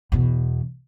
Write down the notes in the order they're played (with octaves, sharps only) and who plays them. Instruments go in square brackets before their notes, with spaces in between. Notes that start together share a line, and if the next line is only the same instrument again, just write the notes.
[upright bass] E2 B2